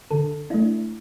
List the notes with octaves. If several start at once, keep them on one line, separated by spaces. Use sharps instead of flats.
D3 A4
A3 D4 E4